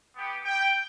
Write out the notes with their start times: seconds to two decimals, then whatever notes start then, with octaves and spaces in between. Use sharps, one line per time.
0.16 B3 G4
0.45 G5